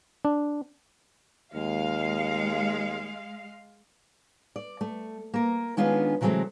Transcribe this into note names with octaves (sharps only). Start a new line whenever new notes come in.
D4
D#2 G#3 F5
D5
A3
A#3 A#4
D#3 G#3 B3 C#4 D4 F4
C3 E3 F#3 G#3 A3 C4